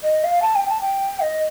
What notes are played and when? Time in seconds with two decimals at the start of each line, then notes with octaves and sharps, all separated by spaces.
0.04 D#5
0.24 F5
0.42 A5
0.55 G5
0.69 A5
0.81 G5
1.21 D#5